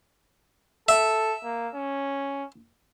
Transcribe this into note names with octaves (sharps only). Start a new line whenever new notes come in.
A4 E5
A#3
C#4